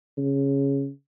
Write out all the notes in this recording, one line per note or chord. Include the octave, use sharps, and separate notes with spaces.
C#3